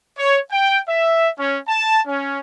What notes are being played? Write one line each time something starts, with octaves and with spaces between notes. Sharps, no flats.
C#5
G5
E5
C#4
A5
C#4